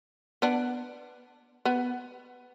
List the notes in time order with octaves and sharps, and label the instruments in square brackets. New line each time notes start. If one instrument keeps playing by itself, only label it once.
[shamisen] B3 D4
B3